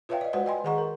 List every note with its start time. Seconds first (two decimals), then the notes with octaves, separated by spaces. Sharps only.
0.09 F4 B4 C#5 E5 F5 G5
0.21 D5 D#5
0.33 G#3 F#4 B4 C5 D5 F#5
0.46 D5 D#5 G5 G#5 B5 C6
0.64 D#3 G#4 D#5 F#5 A#5 C#6
0.78 A#4